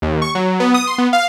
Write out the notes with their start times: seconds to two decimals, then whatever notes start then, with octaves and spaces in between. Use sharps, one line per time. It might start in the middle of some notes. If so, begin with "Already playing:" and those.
0.02 D#2
0.22 C#6
0.35 F#3
0.60 B3
0.74 D#6
0.87 C6
0.98 B3
1.13 F5